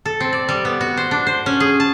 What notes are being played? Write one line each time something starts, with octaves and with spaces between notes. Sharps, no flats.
A4
C4
D5
G3
B3
F#4
C5
D4
C5
C#4
G#4
A5